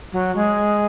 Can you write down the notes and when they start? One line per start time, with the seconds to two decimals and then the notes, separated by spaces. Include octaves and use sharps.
0.12 F#3
0.35 G#3